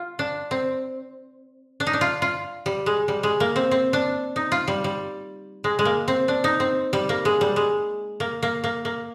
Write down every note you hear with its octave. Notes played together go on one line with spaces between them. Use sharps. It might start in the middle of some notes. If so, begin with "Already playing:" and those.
Already playing: F4
D4
C4
D4
D#4
D4
F4
F4
G3
G#3
G3
G#3
A#3
C4
C4
D4
D#4
F4
G3
G3
G#3
G#3
A#3
C4
D4
D#4
C4
G3
A#3
G#3
G3
G#3
A#3
A#3
A#3
A#3